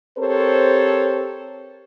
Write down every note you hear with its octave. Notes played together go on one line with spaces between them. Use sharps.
C4 G4 A4 A#4 C5 C#5